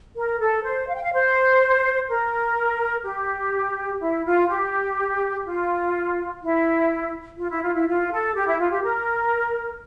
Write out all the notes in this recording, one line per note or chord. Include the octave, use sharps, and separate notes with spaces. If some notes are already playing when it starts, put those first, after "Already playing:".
A#4
A4
C5
F5
G5
F5
C5
A#4
G4
E4
F4
G4
F4
E4
F4
E4
F4
E4
F4
A4
G4
E4
F4
G4
A#4